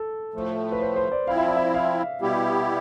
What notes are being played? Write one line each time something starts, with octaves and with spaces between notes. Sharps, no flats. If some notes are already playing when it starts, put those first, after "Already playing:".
Already playing: A4
A2 F3 A3
B4
C5
C5
D5
F3 C4 E4 F5
E5
D5
E5
F5
B2 G3 B3 E4 G4